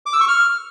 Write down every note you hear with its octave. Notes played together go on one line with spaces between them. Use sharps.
D6
E6
C#6
F6